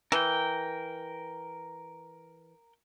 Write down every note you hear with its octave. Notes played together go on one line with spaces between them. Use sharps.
E3 A#4 G5